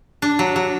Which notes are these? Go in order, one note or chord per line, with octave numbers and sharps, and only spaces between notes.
D4
F#3
F#3